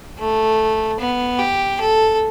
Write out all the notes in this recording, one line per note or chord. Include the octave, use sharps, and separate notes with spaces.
A3
B3
G4
A4